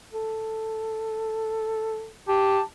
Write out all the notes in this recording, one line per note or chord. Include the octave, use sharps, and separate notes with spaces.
A4
G4 A5